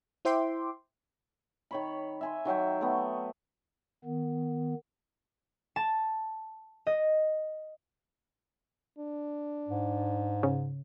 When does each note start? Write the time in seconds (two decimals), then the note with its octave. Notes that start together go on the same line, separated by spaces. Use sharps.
0.25 E4 C5 E5 G5 C6 D6
1.71 D#3 C#5 B5
2.21 E5 G#5 C6
2.45 D#3 F#3 E5 G5
2.81 A3 B3
4.05 D#3 B3
5.76 A5
6.87 D#5
8.98 D4
9.68 G#2
10.43 C#3